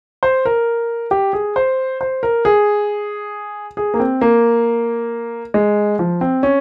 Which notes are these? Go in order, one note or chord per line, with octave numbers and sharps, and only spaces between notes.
C5
A#4
G4
G#4
C5
C5
A#4
G#4
G#4
A#3
C4
A#3
G#3
F3
C4
C#4